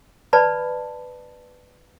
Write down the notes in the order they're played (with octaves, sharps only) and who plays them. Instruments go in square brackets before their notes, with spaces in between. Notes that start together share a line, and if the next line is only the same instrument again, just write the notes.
[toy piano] B4 D5 A5 B5